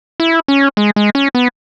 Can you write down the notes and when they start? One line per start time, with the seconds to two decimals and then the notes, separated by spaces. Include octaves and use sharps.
0.20 E4
0.48 C#4
0.77 G#3
0.96 G#3
1.15 C#4
1.35 B3